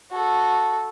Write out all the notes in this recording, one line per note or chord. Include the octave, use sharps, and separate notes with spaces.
F#4 A4